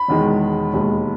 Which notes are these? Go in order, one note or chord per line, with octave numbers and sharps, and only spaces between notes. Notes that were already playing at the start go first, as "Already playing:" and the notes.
Already playing: B5
E1 E2 D#3 G#3
E1 D#2 D#3 G#3